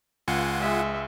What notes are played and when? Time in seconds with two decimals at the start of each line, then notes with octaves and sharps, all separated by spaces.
0.28 C#2 F4 F#5 G#5
0.58 G#3 E5